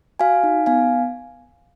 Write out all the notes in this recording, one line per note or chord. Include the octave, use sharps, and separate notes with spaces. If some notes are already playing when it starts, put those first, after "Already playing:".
F#4 F5 G#5
D#4
B3 F5 G#5